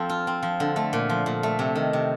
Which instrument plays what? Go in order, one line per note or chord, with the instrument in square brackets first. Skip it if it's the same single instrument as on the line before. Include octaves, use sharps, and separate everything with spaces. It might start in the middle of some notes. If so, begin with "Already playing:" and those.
Already playing: [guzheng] F3 C4 A4
F4
C4
F3
D3
A3
A#2
F3
A#2
A3
C3
D#3
C3